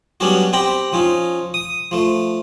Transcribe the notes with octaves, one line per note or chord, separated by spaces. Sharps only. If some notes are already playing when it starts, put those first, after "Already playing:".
F#3 G3 B3 C#4 D4 F#4
C4 G4 G5 A#5 B5
F3 C#4 D#4
D#6
F3 A3